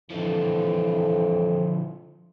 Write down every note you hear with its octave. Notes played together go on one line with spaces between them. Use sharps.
F2 D3 E3 F3